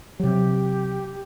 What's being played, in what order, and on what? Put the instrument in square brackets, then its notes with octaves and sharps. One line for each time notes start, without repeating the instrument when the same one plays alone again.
[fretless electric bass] C3 F#3 [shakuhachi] G4